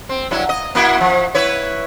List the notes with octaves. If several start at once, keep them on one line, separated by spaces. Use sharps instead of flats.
C4
G2 F#3 E4
D#5
A#3 E4 F#4
F3
E4 B4 C#5